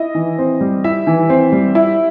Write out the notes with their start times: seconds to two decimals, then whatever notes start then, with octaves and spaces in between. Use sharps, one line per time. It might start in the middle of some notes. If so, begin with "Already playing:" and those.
Already playing: E4 D#5
0.15 E3
0.38 C4
0.60 G3
0.84 E4 E5
1.07 E3
1.30 C4
1.52 G3
1.75 E4